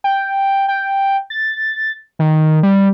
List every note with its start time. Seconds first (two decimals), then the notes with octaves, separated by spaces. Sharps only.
0.04 G5
0.68 G5
1.30 A6
2.19 D#3
2.63 G3